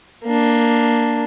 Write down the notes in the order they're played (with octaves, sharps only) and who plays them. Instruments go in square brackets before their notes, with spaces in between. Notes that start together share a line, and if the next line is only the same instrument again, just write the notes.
[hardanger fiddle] A#3 D4